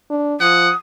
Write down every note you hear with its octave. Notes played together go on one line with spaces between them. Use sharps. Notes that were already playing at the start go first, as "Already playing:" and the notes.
D4
F3 F#5 D#6